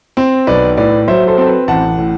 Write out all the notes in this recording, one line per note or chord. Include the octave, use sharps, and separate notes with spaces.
C4
B1 B4 D5
A2 B4 D5
F#3 C5 E5
A4 C5
C4 A4
B4
A1 F#5 A5
A2